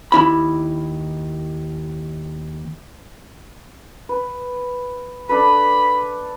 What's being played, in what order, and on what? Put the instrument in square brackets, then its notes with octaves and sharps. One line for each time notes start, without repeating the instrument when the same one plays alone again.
[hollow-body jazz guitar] D#2 E4 B5
[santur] B4
[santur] D4 A4 B4 [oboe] B5